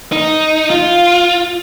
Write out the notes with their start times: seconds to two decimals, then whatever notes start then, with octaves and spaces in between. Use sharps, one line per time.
0.12 D#4
0.70 F4